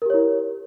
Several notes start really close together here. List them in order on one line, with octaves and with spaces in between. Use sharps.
A#4 G4 C#5 E4